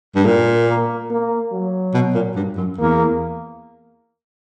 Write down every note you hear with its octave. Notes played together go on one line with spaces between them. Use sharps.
G2
A#2 A#3
A#3
A#3
F#3
B2
A#2
G2
F#2
E2 A#3